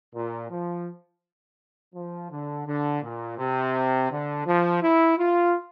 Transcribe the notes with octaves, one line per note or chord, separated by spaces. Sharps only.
A#2
F3
F3
D3
D3
A#2
C3
D3
F3
E4
F4